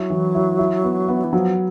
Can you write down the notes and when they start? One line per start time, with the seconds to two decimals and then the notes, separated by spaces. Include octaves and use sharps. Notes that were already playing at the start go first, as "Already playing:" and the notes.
Already playing: F#3 E4
0.10 E3
0.35 E4
0.59 E4
0.84 B3
1.08 B3
1.24 E3
1.33 F3 F#3